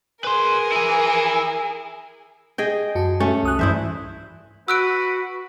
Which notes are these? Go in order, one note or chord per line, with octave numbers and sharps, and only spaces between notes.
G#4 A#4 B4 C6
E4 G#5
G#4 D#5 G5
F#2 F#4 A5
A3 C#4
C2 D#6 F#6
G2 E3 E4 C5 E5
F#4 B4 E6 F#6 D7